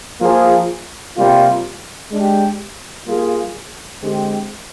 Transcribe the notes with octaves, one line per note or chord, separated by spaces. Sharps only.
F3 A#3 F4 G#4
C3 G3 A#3 F4
G#3 D4 G4
G3 A#3 F4 G#4
D3 G#3 C4 G4